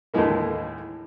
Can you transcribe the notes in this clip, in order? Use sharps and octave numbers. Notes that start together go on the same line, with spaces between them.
D#2 A2 D3 E3 G#3 A#3